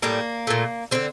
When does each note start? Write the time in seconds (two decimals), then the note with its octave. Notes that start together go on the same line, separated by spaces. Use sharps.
0.02 A2 G3 A#3
0.47 A#2 A3
0.91 D3 G3 C4